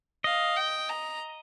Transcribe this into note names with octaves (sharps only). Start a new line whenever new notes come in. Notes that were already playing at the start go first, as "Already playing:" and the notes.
D#5 F5
G5
A#5